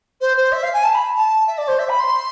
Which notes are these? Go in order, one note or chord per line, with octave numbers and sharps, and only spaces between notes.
C5
C5
E5
F5
G#5
A5
B5
A5
E5
D5
C5
E5
B5
C6